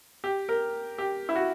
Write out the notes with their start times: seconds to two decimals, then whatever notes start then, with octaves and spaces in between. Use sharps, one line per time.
0.24 G4
0.49 A#4
0.98 G4
1.29 E4
1.36 F#4